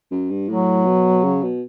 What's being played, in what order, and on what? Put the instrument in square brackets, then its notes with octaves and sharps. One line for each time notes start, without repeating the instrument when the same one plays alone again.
[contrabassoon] F#2
G2
[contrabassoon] A2 [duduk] F#3
[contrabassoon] B2
C#3
B2